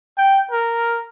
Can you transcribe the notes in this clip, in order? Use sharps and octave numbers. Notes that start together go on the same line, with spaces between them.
G5
A#4